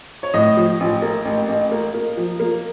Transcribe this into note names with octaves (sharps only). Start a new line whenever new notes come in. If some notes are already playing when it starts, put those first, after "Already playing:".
C#5
A2 D#5
F3
A1
A#3
A1
A1
A#3
A#3
F3
A#3